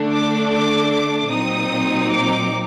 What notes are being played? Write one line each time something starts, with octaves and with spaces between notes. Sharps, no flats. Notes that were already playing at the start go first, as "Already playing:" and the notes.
Already playing: D3 A3 D4
D6
D6
D6
A#2 F#3 C4 D#4 D#6
D6